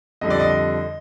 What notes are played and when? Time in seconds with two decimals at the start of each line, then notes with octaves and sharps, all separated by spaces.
0.21 F2 D3 G3 D#5
0.30 D5
0.40 D#5